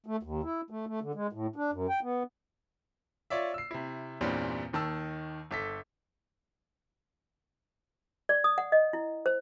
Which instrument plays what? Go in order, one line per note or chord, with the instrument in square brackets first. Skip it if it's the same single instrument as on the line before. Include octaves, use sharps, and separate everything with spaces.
[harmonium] A3
D#2
E4
A3
A3
D3
G#3
A2
D4
F#2
G5
B3
[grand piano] F4 C#5 D5 E5
E6 C7
C3 E4
E2 G2 A#2 G3 C4 C#4
D#2 D#3 A5 E6
G1 A4 B6
[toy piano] D5
D#6
F#5
D#5
E4
C5